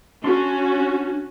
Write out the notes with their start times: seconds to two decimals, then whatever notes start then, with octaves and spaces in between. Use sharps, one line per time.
0.24 C#4 D4 F#4 C6